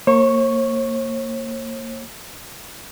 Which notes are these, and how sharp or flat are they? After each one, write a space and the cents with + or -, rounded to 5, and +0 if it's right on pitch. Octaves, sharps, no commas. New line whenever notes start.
A#3 -20 C#5 -45 C#6 +0